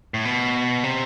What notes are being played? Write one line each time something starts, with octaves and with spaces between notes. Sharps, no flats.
A2
B2
C3